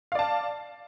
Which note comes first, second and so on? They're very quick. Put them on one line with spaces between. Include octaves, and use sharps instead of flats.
F5 D5 A5